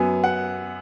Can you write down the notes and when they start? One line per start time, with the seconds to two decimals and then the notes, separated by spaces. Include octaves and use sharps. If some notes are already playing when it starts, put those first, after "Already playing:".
Already playing: F#2 F#3 B3 G#5
0.24 F#5